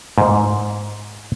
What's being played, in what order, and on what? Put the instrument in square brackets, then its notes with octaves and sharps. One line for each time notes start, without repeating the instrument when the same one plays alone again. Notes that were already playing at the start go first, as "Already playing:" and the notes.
[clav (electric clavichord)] G#2